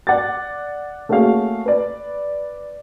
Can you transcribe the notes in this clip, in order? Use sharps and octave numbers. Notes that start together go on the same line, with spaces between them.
D5 F#5 D6 A6
A3 A#3 C#4 F#4 G#4 F5
B4 D5